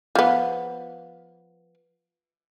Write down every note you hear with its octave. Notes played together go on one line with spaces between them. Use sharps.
F3 B3